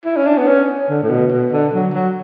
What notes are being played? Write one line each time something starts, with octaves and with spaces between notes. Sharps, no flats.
E4
C#4
D4
B3
C#4
D3
A2
B2
B2
D3
F#3
F#3